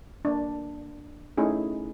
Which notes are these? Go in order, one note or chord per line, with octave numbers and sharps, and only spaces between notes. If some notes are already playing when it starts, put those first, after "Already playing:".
A#3 D4
A3 C#4 D#4 E4 G#4